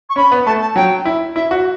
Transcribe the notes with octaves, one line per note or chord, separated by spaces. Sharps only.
C#6
C#4 B5
B3
A3 A5
A5
F#3 G5
E4
E4 E5
F#4